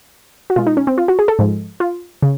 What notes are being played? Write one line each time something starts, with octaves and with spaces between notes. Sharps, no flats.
F#4
B2 G#3 F4
D#4
C#4
C4
F4
F#4
G#4
A4
G#2 F3 G#3
F4
C#3